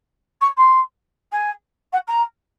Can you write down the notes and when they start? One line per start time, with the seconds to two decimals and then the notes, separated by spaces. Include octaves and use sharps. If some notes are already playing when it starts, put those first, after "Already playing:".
0.41 C#6
0.57 C6
1.32 G#5
1.92 F#5
2.07 A#5